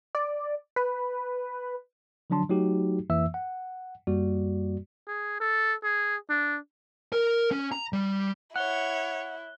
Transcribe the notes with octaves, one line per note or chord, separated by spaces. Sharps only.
D5
B4
D3 F3 F#3 D4 A5 C6
F#3 A3 D#4 F#4 G4
F2 E3 A#3 E5 E6
F#5
F#2 G3 A#3 F#4 D5
G#4
A4
G#4
D4
A#4
C#4
A#5
G3
E4 C#5 F#5 F#6 G7